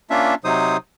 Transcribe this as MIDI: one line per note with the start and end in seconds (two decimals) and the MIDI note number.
0.10 0.35 58
0.10 0.35 61
0.10 0.35 62
0.10 0.35 65
0.10 0.35 76
0.44 0.77 48
0.44 0.77 54
0.44 0.77 63
0.44 0.77 72
0.44 0.77 87